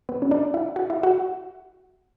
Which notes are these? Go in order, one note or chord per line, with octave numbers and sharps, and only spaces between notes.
B3
C#4
D4
E4
F#4
E4
F#4